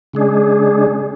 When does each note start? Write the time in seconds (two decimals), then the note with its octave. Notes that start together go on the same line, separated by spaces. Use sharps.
0.13 C#3 G#3 D4 G#4